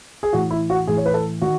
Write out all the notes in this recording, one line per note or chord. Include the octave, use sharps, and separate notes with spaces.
G#4
A2 E3 F#4
E4
F#4
A2 E3 G#4
C#5
B4
A4
D#3 F#4